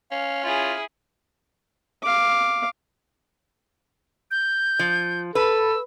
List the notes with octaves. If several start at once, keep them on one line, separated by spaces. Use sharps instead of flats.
C#4 F5
E4 F4 G#4
F5 D6
G6
F3
A4 B4 E6